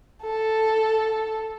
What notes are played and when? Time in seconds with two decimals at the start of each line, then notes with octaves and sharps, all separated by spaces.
0.23 A4